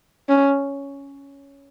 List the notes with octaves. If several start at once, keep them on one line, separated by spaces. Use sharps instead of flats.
C#4